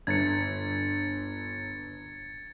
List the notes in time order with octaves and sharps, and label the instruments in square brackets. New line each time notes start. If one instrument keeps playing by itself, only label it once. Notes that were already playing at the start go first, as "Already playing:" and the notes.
[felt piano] G1 [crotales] G#6 A6 C#7